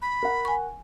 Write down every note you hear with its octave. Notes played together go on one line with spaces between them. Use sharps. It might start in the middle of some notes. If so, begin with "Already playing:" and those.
B5
A#4 F#5
G#5 C#6